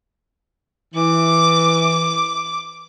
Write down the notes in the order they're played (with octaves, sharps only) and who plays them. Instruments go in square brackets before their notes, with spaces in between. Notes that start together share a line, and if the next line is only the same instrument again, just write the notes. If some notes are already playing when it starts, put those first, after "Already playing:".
[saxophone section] E3 [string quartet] D6